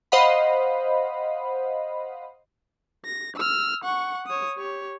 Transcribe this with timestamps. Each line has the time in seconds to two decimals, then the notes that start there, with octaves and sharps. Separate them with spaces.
0.12 C5 D#5 F5 F#5 B5
3.05 A#6
3.36 E6 F6
3.84 F#5 C#6
4.27 C#5 D#6
4.58 G4 C#5